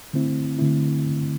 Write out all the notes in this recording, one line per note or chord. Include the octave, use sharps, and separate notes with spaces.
D3 A3 C4 E4
D3 A3 C4 E4